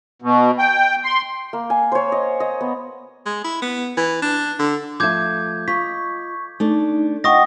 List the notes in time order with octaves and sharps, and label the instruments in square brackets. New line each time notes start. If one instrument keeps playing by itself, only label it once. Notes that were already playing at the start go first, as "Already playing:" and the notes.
[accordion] B2
G5
C6
[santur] A#3
G#5
C5 C#5
D#5
D#5
B3
[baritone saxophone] G#3
E4
B3
E3
D4
D3
[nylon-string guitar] F3 A3 E5 [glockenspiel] D6 G6 G#6
[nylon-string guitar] F4 D#5 [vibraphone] C#6 [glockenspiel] B6
[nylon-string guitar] A3 D4 [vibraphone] D#4
[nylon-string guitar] F4 [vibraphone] D#5 F#5 G5 [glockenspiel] C#6 D#6 A#6